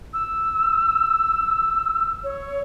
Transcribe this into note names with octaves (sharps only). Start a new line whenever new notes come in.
E6
C#5